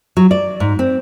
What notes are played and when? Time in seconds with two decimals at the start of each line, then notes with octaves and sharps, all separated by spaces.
0.17 F#3
0.31 D5
0.60 G#2
0.79 C4